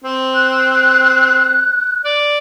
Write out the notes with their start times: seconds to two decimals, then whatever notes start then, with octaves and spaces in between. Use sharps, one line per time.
0.04 C4
0.35 F#6
2.05 D5